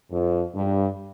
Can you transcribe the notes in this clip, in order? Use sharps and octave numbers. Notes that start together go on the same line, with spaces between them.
F2
G2